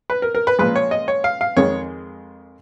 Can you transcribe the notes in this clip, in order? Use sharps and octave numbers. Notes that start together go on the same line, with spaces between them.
B4
A#4
A#4
B4
A#2 F3 G#3 B4
C#5
D#5
C#5
F5
F5
F2 D#3 G#3 C#5